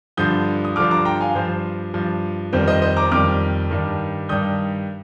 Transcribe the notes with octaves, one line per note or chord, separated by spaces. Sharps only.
G2 D3 F3 D#6 G6
D#6
G2 D3 F3 D6 F6
A#5 D6
G5 A#5
F5 G#5
G2 F3 C5
G2 F3
F2 D#3 G3 C5
C5 D#5
C5 D#5
A#5 D6
F2 D#3 G3 D6 F6
G2 D#3 G3
G2 D#3 G3 D#6 G6